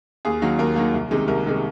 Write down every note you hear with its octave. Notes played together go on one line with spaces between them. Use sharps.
D#2 G#4
D#3 F#3 A#3
D#2 A#4
D#3 F#3 A#3
C2
C3 D#3 G#3
C2 A#4
C3 D#3 G#3